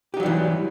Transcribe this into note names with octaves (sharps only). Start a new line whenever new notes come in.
E3 F#3 G3 D#4 G4